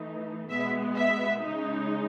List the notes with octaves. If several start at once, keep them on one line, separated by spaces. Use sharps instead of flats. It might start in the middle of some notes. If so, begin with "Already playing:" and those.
Already playing: E3 A3 D#4
B2 G#3 B3 E5
E5
C#3 G#3 D#4